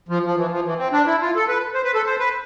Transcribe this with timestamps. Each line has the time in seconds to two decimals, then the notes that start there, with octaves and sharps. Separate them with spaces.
0.09 F3
0.24 F3
0.37 E3
0.51 F3
0.64 E3
0.78 C4
0.92 D4
1.06 E4
1.21 F4
1.35 A4
1.48 B4
1.74 C5
1.84 B4
1.94 A4
2.06 C5
2.19 B4